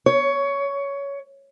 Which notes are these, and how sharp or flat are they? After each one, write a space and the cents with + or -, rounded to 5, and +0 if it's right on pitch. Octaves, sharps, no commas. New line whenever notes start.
C#5 +15